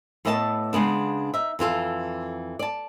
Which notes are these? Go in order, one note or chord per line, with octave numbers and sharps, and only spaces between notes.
A2 A3 B3 D#5 G5 A5
C#3 G#3 B3 D4
D#4 E5
F2 E3 F4 A4
D5 A5